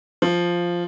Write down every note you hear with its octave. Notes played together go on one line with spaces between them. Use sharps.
F3